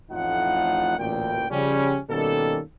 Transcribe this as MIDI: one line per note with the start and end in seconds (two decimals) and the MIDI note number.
0.11 0.97 33
0.11 0.97 41
0.11 0.97 45
0.11 0.97 63
0.11 0.97 65
0.11 0.97 78
0.98 1.45 33
0.98 1.45 38
0.98 1.45 46
0.98 1.45 79
1.50 1.98 49
1.50 1.98 53
1.50 1.98 55
1.50 1.98 61
2.10 2.60 47
2.10 2.60 51
2.10 2.60 55
2.10 2.60 58
2.10 2.60 61
2.10 2.60 69